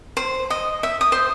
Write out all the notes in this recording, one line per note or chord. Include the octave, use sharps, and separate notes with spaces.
C5
D#5
E5
D#6
C5